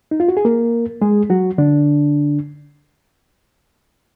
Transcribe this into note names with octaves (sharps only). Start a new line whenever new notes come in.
D#4
F4
F#4
G#4
A#3 A#4
G#3 G#4
F#3 F#4
D3 D4